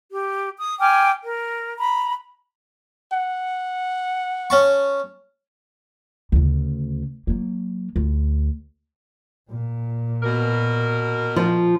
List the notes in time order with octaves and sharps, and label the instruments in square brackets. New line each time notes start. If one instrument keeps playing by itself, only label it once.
[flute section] G4
D#6
G5 G#5 D6 F6
A#4
A#5 B5
[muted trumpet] F#5
[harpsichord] C#4 A5 C#6
[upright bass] D2 C#3
F#3 A#3
D2
[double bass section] A#2
[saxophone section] B2 A#4
[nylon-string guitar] F3